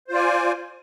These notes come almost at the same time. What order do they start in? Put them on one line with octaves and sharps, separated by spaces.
C5 F4 D5 G#5